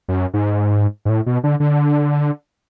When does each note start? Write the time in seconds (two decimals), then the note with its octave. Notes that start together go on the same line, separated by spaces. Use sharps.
0.08 F#2
0.34 G#2
1.05 G#2
1.09 A2
1.26 B2
1.44 D3
1.60 D3